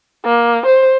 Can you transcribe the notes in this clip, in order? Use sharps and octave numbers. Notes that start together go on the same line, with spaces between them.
A#3
C5